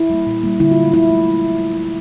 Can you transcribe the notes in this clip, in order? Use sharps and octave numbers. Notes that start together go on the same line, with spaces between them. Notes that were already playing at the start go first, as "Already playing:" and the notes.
Already playing: E4
G3 A#3
A#2
G3 A#3
D3 E4
F#3 F4
A3
D3 E4
F#3 A3